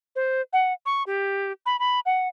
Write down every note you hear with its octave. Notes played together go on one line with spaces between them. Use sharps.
C5
F#5
C#6
G4
B5
B5
F#5